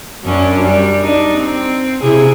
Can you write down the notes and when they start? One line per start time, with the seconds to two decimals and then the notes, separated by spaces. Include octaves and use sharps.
0.24 F#2 C#4 D4
0.64 G3
1.02 D4 D#4
1.37 C4
2.02 C3 E4 G#4